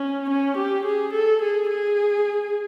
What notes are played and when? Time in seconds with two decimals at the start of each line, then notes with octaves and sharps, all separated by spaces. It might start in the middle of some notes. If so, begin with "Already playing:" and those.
Already playing: C#4
0.30 C#4
0.57 G4
0.86 G#4
1.14 A4
1.42 G#4
1.70 G#4